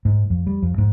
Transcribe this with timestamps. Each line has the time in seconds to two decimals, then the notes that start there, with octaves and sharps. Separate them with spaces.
0.05 G#2
0.30 F2
0.47 G3
0.62 F2
0.78 G#2